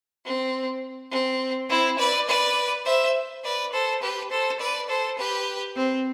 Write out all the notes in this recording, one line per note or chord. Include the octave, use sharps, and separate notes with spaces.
C4
C4
C4 E4
B4 D5
B4 D5
C5 E5
B4 D5
A4 C5
G4 B4
A4 C5
B4 D5
A4 C5
G4 B4
C4